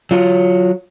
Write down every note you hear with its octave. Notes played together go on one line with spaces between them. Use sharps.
F#3 F4 C#5